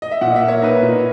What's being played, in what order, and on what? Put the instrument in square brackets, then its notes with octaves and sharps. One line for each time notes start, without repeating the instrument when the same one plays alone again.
[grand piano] D#5
E5
A#2 F#5
E5
A#3
C#5
D#4 B4
A#2